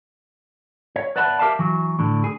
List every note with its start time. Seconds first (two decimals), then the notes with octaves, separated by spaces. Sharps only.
0.96 C#5
1.16 B4 D5 E5 F#5 A5 B5
1.39 G4 A#4 E5 F5 A5
1.59 E3 F#3
1.99 A2 D3
2.24 G#4